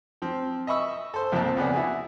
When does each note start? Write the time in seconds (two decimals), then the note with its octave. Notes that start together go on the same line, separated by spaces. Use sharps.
0.22 F3 C4
0.67 D#5 E5 B5 C#6 E6
1.14 A4 C5
1.32 C2 F2 A#2 C4 A5
1.57 C#2 B3 G#4 D5
1.73 E4 F#4 G#4